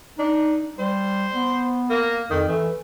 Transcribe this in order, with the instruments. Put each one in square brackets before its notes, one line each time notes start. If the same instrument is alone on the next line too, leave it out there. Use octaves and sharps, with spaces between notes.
[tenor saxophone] D4 [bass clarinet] D#4
[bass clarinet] G3 [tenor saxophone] C5
[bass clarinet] B3
[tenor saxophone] A#3
[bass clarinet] F2 [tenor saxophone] D#3
[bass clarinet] E3 [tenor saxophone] A3